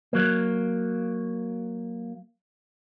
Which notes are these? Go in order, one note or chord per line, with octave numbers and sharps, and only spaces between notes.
F#3 A#3